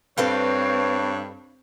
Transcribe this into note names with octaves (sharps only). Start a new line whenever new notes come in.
G2 C4 A4 B4 C#5 F5